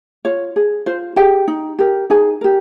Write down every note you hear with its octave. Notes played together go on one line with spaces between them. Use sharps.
F4 C#5
G#4
F4 C5
G4 G#4 G5
D#4
G4 A#4
D#4 G#4 G#5
G4 A#4